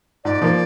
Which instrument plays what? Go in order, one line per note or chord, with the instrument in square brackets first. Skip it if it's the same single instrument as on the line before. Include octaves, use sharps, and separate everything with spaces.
[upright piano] G#2 [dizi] D5
[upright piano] F3 A#3